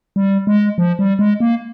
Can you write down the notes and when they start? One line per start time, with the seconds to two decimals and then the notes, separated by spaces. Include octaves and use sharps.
0.16 G3
0.47 G#3
0.78 F3
0.99 G3
1.19 G#3
1.40 A#3